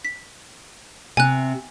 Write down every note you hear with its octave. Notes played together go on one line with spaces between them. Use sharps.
B6
C3 G#5 F#6